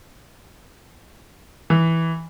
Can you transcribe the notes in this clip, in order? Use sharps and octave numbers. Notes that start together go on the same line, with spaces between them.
E3